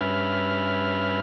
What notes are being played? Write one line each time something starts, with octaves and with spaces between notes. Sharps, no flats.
G2 C#4 B4 E5 B5 F6